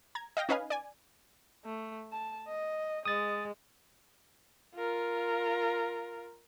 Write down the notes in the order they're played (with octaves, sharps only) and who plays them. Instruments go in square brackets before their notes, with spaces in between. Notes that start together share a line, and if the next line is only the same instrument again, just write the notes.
[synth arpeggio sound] A#5 G#6
D#5 F5 G5 A#6
C#4 D#4 B4 D#5 F5 G#5
D5 G#5
[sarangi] A3
A5
D#5
[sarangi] G#3 [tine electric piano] D#6 A6
[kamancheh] F4 A#4